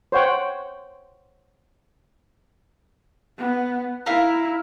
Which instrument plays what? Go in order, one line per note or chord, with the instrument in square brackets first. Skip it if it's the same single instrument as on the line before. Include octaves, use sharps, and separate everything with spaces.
[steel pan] C5 C#5 F#5 G5
[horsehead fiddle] B3
[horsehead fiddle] E4 [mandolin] A#4 E5 F5